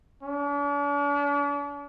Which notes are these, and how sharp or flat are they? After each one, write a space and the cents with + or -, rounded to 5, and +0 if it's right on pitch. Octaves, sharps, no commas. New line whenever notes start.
D4 -45